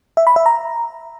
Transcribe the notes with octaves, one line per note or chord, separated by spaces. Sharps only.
E5
B5
E5
A#5